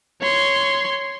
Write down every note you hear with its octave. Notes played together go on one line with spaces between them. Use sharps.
C#5 C6